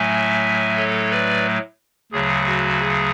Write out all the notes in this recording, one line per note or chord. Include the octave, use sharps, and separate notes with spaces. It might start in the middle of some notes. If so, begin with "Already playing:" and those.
Already playing: A2 F#3 A3 E5 G#5
A4 C#5
B4 D5
D2 C#3 F#3 G#4
F#4
G#4